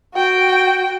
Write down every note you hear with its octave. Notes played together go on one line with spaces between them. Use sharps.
F#4 G5